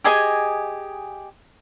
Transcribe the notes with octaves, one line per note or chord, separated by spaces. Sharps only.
G4 G#4 D#5 G#5